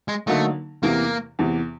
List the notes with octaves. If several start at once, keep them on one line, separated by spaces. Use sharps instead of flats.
G#3
D3 F#3 A3 A#3 D#4
E2 C3 E3 A#3
E2 C3 E3